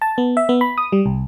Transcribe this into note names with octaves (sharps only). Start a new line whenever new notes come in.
A5
B3
E5
B3
B5
D#6
G3
C2